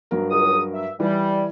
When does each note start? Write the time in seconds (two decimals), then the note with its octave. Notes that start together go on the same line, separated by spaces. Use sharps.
0.11 G2 F#3 A#4
0.30 C#2 D#6
0.74 E5
1.00 E3 G3